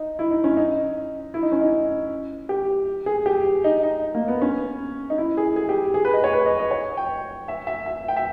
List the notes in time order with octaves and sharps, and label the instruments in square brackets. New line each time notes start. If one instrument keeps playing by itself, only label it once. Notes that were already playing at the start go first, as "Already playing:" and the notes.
Already playing: [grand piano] D#4
E4
D#4
C#4
D#4
E4
D#4
C#4
D#4
G4
G#4
G4
D#4
D#4
A#3
B3
C#4
D#4
E4
G#4
G#4
G4
G#4
B4
D#5
C#5
B4
D#5
D#5
C#5
G5
E5
E5
E5
G5
E5